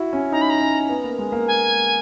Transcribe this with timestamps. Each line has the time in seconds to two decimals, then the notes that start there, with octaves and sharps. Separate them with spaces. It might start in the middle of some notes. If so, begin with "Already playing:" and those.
Already playing: E4 F#4
0.13 C#4
0.32 D#4 A#5
0.41 B5
0.50 A#5
0.61 C#4
0.89 B3
1.04 A#3
1.19 G#3
1.32 A#3
1.47 G#5